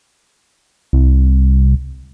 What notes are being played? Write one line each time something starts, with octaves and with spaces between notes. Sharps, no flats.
C2